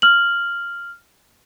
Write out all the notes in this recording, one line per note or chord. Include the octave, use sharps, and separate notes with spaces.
F6 F#7